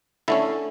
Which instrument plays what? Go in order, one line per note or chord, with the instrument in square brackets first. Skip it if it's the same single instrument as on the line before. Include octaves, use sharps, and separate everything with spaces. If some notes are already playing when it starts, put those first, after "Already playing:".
[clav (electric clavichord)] D3 A3 C#4 E4